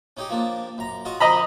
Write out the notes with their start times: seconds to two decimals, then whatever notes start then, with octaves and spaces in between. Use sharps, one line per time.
0.17 C#4 D#4 G4
0.30 F3 A#3 D4
0.78 F#2 A#5
1.05 F4 F#4 D#5
1.20 F3 A#4 C5 D#5 A#5 B5